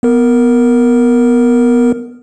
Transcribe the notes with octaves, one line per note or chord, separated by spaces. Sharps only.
B3 A#4